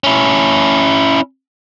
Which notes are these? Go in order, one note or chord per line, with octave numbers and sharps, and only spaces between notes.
C#4 E4